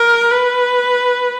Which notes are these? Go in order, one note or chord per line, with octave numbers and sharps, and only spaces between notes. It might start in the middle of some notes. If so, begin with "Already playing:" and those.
Already playing: A#4
B4